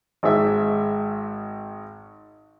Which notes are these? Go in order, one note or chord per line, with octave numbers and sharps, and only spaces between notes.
G#1 G#2 E5